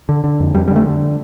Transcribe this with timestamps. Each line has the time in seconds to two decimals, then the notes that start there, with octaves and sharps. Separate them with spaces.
0.09 D3
0.24 D3
0.40 F2
0.55 F2 G3
0.68 G3
0.71 D3 A3
0.86 D3